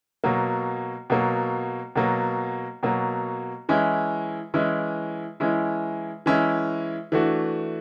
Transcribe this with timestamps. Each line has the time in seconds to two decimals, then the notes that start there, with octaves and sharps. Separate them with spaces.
0.24 B2 F#3 A#3
1.10 B2 F#3 A#3
1.96 B2 F#3 A#3
2.83 B2 F#3 A#3
3.69 E3 G#3 C#4 E4
4.54 E3 G#3 C#4 E4
5.40 E3 G#3 C#4 E4
6.26 E3 G#3 C#4 E4
7.12 E3 A3 D4 F#4